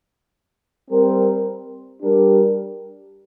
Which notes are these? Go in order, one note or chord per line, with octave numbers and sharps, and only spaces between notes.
G3 C4 A#4
G3 D4 G4 A#4